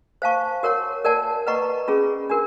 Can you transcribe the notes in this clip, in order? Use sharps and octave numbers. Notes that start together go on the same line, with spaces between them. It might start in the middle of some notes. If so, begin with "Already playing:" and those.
C5 F5 A5 C#6
F#4 A#4 C#5 F#5
A#4 D5 F#5 A5
B4 D#5 F#5 A#5 C#6
C#4 F4 G#4
D4 F#4 A#4